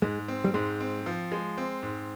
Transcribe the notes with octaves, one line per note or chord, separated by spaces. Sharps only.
G#2 G#3
C4
G3
G#2 G#3
C4
F3
G#3
C4
G#2